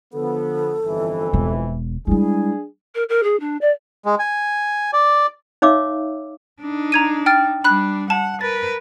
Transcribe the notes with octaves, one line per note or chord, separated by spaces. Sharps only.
D3 F3 B3 A4
G1 F2 E3
E1
G3 G#3 D4 E4 G#4
A#4
A#4
G#4
D4
D5
G#3
G#5
D5
D#4 C#5 E5 F5 D6 E6
D4 D#4
A#5 G#6 D#7
G5 F6 A6
G3 D4 B5 F#6
F#5 A5
A#4 B4 A6